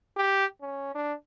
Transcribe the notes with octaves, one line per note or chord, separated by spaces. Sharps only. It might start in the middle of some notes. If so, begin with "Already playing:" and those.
G4
C#4
D4